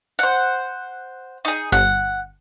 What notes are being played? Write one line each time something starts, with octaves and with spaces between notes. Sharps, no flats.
C5 F#5
D#4 G#4
G1 F#5